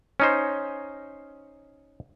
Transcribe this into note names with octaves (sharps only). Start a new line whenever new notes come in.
C#4 D#4 C5